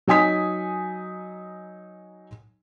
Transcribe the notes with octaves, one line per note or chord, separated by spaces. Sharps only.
F#3 D#4 G#5 D#6 B6